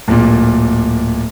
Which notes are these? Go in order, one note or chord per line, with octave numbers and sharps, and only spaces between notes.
D1 A#2